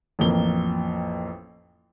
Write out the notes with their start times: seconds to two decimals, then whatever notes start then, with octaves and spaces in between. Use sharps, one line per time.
0.19 A1 F2 A#3 G7